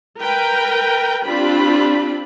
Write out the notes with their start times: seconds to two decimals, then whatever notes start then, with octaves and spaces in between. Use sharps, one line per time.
0.19 A#4 B4 G5
1.26 C4 D4 F4 G4 B5